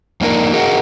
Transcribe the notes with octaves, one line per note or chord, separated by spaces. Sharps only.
F2 A#3 D4 D#4 A#4
F#4 G#4 A#4 D#5 F#5